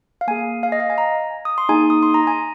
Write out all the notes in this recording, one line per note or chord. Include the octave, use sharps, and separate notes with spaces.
F5
A#3 G#4 G#5
F5
D#5
F5
G#5
A#5
D#6
C6
A#3 D#4 G#4 G#5
D#6
C6
A#5
G#5